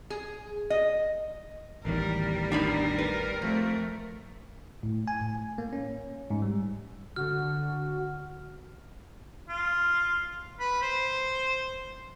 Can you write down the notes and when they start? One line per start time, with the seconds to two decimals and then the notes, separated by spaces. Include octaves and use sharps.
0.10 G#4
0.70 D#5
1.85 A1 E2 D#3 G3 A#4
2.52 D4 D#4 A#4 B5
2.98 B4
3.42 F2 A3
4.83 A2
5.08 G#5
5.21 A2
5.58 A#3
5.73 C#4
6.30 G#2
6.42 G3
7.16 D3 F#4 F6
9.49 F4
10.60 B4
10.82 C5